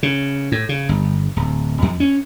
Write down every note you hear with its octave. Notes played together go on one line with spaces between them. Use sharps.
C#3
A2
C#3
G1
D1
F2
C#4